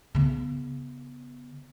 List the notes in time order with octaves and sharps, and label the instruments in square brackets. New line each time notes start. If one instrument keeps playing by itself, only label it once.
[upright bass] C#3 B3